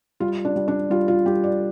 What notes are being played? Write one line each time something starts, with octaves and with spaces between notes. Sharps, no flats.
G3 F4
D4
G3
D4
G3 F4
F4
G3 G4
D5